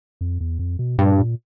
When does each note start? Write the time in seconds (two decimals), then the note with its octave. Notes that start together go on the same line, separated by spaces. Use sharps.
0.21 F2
0.40 E2
0.59 F2
0.79 B2
0.98 G2 A#2
1.18 A#2